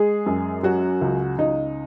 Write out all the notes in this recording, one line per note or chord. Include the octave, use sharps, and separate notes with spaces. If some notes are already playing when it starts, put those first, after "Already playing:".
Already playing: G#3 G#4
F#2
F#3 F#4
C#2
C#2 D#4